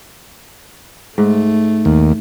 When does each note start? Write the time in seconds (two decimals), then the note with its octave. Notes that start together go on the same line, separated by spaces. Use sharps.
1.18 G#2 A3
1.85 D#2